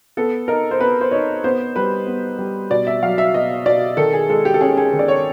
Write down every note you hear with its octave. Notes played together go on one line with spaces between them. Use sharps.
B3 A4
D#4 A#4
C5
B3 B4
C5
D#4 C#5
B3 C5
G3 B4
B3
G3
B2 D5
E5
F#3 F5
E5
B2 D#5
B2 D5
D#3 A4
G#4
G#3 A4
G4
A4
C#4 G#4
G#4
D#3
D5
C#5